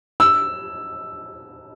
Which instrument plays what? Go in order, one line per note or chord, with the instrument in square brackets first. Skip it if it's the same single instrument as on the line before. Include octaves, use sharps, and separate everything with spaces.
[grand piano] E6